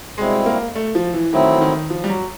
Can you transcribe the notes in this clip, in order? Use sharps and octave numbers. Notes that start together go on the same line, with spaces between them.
B2 G3 G#3 C4 E4
A#3
A3
F3
E3
D#3 F#3 A3 C4 E4
E3
D#3
F3
G3
F#3